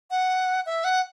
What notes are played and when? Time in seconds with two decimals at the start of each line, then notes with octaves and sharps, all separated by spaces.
0.11 F#5
0.66 E5
0.84 F#5